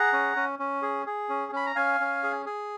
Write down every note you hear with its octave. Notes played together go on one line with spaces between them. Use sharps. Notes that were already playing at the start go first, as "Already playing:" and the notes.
Already playing: G#4 F#5 A#5
C#4
C#4
C#4
G#4
G#4
C#4
C#4 B5
A#5
C#4 F5 G#5
C#4
G#4
G#4